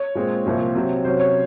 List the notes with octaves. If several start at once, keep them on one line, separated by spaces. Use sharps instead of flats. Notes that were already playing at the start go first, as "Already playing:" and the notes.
Already playing: C#5
A#2 G#3 C4
C2 A#2 F3 C4
C3 F#3 C4
C3 F#3 C#4 C5
C#5